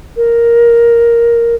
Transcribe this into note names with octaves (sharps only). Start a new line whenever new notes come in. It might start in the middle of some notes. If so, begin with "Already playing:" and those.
A#4